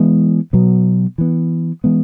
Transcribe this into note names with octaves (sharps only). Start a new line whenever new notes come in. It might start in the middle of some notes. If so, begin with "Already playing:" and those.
Already playing: E3 G#3 B3
B2 F#3 B3
E3 B3
E3 G#3 B3